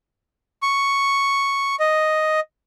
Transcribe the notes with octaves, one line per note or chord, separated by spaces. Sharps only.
C#6
D#5